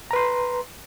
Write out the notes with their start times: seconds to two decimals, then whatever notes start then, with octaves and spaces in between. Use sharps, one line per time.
0.11 A#5
0.13 B4
0.16 C6